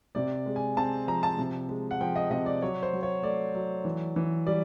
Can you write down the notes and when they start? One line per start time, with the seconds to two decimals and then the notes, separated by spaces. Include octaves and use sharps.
0.15 C3 D5
0.46 G#3
0.56 G#5
0.77 C4 A5
1.07 F3 A#5
1.23 A5
1.38 C3
1.69 G#3
1.91 F#5
2.01 F3 G5
2.16 D#5
2.30 C3 D#5
2.46 D5
2.62 F#3 C#5
2.83 C5
2.93 F#3
3.03 C#5
3.23 A3 D5
3.55 F#3
3.85 E3
4.16 E3
4.46 G3 D5